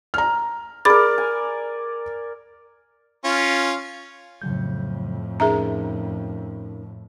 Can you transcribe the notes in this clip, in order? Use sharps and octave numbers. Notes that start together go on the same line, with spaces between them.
A#5 F6
G#4 A#4 D5 B5 A6
G#5
C#4 F4
F2 A2 C#3 F#3 G6
C#4 D#4 G#4 A#4 E5 A#5